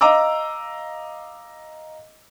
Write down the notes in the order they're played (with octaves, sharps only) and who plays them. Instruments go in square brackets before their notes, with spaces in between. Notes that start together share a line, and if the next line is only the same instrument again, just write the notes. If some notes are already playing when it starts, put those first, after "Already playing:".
[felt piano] D#5 F5 A#5 D6 E6